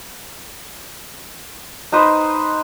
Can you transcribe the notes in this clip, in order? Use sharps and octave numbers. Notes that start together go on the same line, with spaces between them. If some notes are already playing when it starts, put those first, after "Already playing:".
D#4 B4 C5 D#6